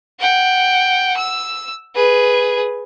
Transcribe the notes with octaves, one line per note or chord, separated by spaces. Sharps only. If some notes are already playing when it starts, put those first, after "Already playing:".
F#5 G5
E6
G#4 B4